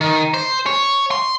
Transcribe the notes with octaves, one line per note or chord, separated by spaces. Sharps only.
D#3
C5
C#5
C6